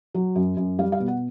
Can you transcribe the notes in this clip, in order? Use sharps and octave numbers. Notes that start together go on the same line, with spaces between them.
F#3
F#2
F#2
G3 F5
F5
B2
F#5